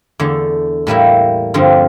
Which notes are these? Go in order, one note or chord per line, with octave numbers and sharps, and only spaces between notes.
E2 D3 A3
A2 G3 A#3 E4
G2 D3 F3 C4